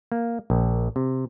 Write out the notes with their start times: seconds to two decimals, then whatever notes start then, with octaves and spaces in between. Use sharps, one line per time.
0.12 A#3
0.50 A#1
0.96 C3